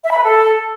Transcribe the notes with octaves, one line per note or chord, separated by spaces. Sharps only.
E5
B5
B4
A4